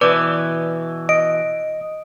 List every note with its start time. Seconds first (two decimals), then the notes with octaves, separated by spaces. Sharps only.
0.01 B2 E3 B4 D5 D6
1.09 D#5 D7